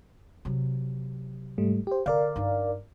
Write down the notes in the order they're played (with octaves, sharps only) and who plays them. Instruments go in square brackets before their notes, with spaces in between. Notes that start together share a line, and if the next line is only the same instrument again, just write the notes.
[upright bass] C3 F#3
[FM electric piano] G#2 G3 A3
G4 C5
[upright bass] D3 [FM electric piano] A#4 D5 F5
[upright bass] G2 D#4